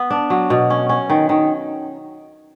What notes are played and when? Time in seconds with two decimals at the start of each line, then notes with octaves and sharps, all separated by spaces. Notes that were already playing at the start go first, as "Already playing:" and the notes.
Already playing: B3
0.10 D4
0.30 F#3
0.50 B2
0.70 C#4
0.89 C#4
1.10 D#3
1.29 D#3